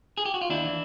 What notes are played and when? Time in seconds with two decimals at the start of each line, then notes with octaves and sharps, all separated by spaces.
0.18 G#4
0.25 G4
0.34 F#4
0.41 F4
0.50 D#2 D4 E4
0.64 E3